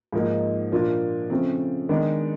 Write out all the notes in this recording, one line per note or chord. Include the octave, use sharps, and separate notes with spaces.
G#2 F3 A#3 D#4
A#2 F3 A#3 D4 F4
C#3 F3 A3 C4
D#3 G#3 B3 D4